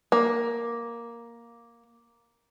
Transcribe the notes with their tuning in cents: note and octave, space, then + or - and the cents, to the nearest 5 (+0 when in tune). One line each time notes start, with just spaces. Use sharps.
A#3 +5